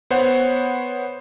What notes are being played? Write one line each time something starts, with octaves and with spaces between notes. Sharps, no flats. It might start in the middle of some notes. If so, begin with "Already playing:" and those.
B3 C5 C#5 F#5